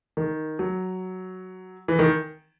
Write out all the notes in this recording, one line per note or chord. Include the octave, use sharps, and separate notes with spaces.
D#3
F#3
E3
D#3